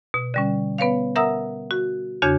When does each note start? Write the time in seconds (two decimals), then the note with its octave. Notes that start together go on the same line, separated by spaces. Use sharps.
0.14 B2
0.34 D3 G3 C#4
0.78 B3 B4 C#5 F5
1.16 A#4 E5 F#5 A#5 D#6 E6
1.71 F#4
2.22 E2 C#3 D4 F#4 C#5 G#6